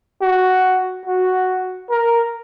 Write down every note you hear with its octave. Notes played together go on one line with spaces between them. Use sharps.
F#4
F#4
A#4